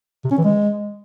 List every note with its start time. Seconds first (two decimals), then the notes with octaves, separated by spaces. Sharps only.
0.25 C3
0.31 C#4
0.38 E3
0.44 G#3